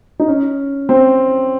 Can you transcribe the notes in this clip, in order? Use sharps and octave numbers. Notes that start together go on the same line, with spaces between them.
D#4
C#4
C4